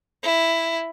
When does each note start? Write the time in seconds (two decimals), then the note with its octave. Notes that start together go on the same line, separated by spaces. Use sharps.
0.23 E4